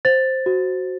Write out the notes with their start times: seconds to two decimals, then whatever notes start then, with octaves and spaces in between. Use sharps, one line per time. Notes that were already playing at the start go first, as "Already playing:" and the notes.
0.05 C5 A6
0.46 F#4